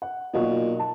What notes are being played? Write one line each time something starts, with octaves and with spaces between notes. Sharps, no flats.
F#5
B1 A#2 F#4 D#5
A5